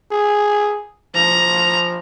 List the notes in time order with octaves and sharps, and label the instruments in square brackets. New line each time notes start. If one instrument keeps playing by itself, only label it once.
[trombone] G#4
[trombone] F3 [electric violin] A#5